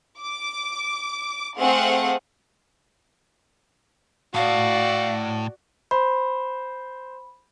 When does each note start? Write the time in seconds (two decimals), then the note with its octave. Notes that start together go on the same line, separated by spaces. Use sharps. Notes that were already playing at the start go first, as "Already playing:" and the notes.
0.19 D6
1.58 A3 C4 G#4 F5 F#5
4.35 A2 F#4 D5 F5
5.91 C5 B5